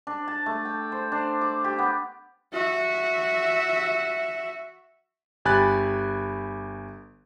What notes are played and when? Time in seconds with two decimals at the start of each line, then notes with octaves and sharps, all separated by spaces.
0.07 D4
0.28 A5
0.46 A3
0.65 G5
0.92 C5
1.12 D4
1.41 D6
1.64 G4
1.79 B3
2.53 F#4 E5
5.45 G1 G4 G#5 B5 F#6 A6